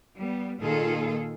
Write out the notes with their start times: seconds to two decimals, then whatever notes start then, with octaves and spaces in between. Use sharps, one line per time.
0.16 G3 B3
0.60 A#2 D#3 A#3 F4 G#4 A4